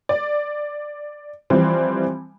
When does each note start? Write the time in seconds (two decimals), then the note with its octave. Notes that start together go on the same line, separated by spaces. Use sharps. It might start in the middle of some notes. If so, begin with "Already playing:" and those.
0.09 D5
1.50 E3 F3 G3 C4